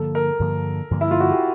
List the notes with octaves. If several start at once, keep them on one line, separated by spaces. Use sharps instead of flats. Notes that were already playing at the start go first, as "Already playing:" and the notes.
Already playing: G2 D3 F3 A#3 A4
A#4
G2 D3 F3 A#3
G2 D3 F3 A#3
E4
F4
F#4
G4